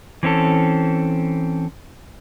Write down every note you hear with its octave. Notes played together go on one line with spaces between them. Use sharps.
E3 C4 C#4 A4